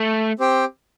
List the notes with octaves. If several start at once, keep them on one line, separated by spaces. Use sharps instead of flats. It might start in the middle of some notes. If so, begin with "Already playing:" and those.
Already playing: A3
C4 G4 C5 G5